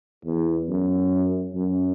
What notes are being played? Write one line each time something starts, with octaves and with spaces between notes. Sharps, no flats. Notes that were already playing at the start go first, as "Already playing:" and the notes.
E2
F#2
F#2